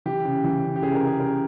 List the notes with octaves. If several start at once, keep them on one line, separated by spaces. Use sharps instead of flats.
E3 G4
C#3
E3
C#3
G4
C#3 G#4
A#4
C#3
G#4
C#3 A#4